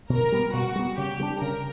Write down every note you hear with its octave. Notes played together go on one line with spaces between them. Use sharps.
B2 A#4
G3 B3
B2 F#4
G3 B3
C#3 G4
G3 B3 D4
C#3 A#4